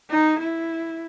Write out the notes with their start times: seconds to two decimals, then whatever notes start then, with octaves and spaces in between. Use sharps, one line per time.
0.11 D#4
0.40 E4